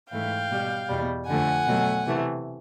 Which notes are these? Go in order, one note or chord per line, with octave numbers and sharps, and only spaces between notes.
G#2 E3 A3 F5 G5
B2 G3
E2 B2 G3
F2 D3 F3 A3 F#5 G#5
B2 F#3 A3
C3 E3 A3